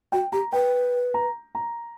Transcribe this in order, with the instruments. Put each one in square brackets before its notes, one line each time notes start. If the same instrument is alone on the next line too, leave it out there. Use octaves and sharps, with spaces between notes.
[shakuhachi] F#4 [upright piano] G5
[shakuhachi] G4 [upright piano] A#5
[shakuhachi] B4 [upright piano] G5
[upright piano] A#5
A#5